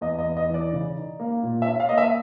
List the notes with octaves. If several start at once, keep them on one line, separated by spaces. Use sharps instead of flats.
E2 D#5
D#5
E2
D#5
E3 D5
C#3
D#4
A#3
A#2
E5
C#4
F5
A#3 D#5
E5